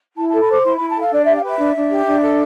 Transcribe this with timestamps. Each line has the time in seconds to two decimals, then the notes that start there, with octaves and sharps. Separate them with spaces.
0.17 E4 A5
0.29 A4 A5
0.41 B5
0.49 C5 D6
0.64 E4 C6
0.76 E4 B5
0.89 A5
0.96 A4 F5
1.12 D4 D5
1.24 G4 E5
1.36 F5
1.44 B4 E5
1.59 D4
1.76 D4
1.91 G4
2.07 D4
2.24 A4